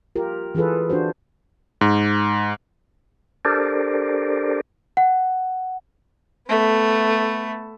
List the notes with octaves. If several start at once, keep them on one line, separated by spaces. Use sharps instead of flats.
F4 G4 A#4
E3 F4 G#4 A4 B4
D4 F4 F#4 C5
G#2
D4 G4 A4 A#4 C5 D5
F#5
A3 B3